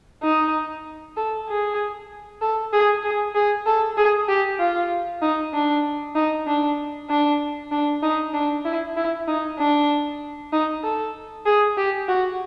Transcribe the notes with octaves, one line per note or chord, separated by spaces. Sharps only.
D#4
A4
G#4
A4
G#4
G#4
G#4
A4
G#4
G4
F4
D#4
D4
D#4
D4
D4
D4
D#4
D4
E4
E4
D#4
D4
D#4
A4
G#4
G4
F#4